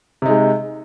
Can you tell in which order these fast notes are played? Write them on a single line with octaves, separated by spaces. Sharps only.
C3 D#4 G#3